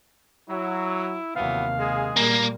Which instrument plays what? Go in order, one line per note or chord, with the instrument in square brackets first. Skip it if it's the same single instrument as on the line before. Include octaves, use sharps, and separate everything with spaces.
[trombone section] F#3 [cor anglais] E4
[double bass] D#2 C3 [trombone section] E3 F#3 B3 [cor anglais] F5
[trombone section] G#3 G#4
[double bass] A#2 G3 [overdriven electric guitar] A#3